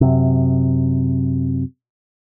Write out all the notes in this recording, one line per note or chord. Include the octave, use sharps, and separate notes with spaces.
F#2 C3